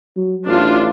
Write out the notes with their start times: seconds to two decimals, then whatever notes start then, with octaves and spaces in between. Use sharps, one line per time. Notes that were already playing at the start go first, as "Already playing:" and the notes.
0.16 F#3
0.46 A1 D4 F4